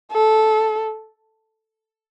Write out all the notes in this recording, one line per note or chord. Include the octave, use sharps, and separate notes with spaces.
A4